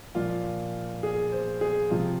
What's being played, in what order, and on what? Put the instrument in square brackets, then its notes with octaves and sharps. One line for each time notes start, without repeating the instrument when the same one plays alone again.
[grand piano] A#2 F3 F4
G#4
C5
G#4
C3 F3 F4